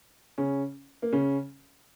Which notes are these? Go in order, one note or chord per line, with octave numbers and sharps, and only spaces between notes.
C#3 C#4
A#3
C#3 C#4